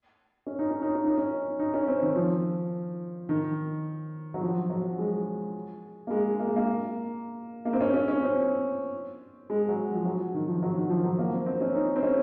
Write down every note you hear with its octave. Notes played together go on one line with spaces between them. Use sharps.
C#4
D#4
C#4
D#4
C#4
D#4
C#4
D#4
C#4
C4
D#3
F3
D#3
F#3
F3
F#3
G#3
A#3
G#3
A#3
G#3
A#3
A#3
C4
C#4
C#4
C#4
C4
G#3
F#3
F3
F#3
D#3
F3
F#3
D#3
F3
F#3
A#3
C4
C4
C#4
D#4
C4
C#4